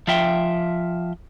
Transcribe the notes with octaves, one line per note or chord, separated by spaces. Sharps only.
F3 F4 E5 G5